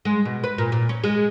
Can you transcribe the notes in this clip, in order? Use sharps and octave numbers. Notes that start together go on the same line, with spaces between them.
G#3
B2
B4
A#2
A#2
C#4
G#3